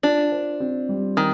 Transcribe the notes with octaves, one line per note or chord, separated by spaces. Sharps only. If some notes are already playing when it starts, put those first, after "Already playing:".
D4 F4
C5
C4
G3
D#3 C4